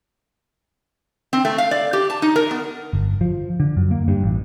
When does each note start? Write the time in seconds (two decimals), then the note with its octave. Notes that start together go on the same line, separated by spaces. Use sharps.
1.33 C4
1.45 A3
1.58 F5
1.71 D5
1.93 G4
2.10 A5
2.22 D#4
2.36 A#4
2.51 B3
2.93 G1
3.21 F3
3.60 D3
3.77 F#2
3.91 A#3
4.08 G2
4.24 A1